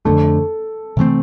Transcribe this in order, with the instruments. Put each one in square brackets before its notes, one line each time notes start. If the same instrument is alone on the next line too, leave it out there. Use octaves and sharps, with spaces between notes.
[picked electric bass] F2 D3 A3 [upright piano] A4
[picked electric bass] C3 E3 A3 C4